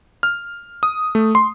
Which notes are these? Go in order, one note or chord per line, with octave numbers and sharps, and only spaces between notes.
F6
D#6
A3
C6